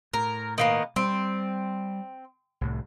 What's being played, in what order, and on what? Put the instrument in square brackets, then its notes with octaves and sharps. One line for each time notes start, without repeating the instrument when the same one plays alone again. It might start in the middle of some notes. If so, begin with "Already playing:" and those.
[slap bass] A2 [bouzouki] A#4
[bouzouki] D#3 A#3 B3
[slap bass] G3 [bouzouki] C4
[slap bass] C2 A2